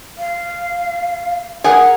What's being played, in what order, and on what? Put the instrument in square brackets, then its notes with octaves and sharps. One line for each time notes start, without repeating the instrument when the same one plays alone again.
[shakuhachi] F5
[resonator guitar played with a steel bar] G#4 A#4 F#5 [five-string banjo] G#5